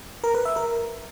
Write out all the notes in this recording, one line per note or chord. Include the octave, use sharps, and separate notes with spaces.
A#4
B4
E5
A#4